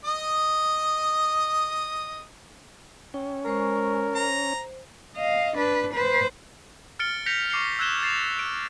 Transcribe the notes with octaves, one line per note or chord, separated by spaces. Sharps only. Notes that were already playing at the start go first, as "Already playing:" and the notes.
D#5 D#6
C#4 G5
G#3 A#4 C5 C#6
C5 A#5
D#5 F5
D4 B4
B4 C5
F6 A6 C#7 D7 G7
G6 A#6 B6 C#7 F7
C#6 D6 C7 C#7 G7
E6 F#6 G#6 E7 G7
A6 C7 E7 F7
D7